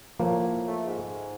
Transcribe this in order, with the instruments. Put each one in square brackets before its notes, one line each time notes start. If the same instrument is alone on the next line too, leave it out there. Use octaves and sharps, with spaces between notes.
[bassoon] A2 [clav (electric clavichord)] F3 A#3
[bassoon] A3
G#2